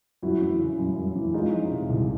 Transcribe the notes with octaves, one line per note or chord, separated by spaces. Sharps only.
F#2 E4 F#4
E3
C#3
F#2
F#2
E3
G#3 D#4 F4
F3
C3
C2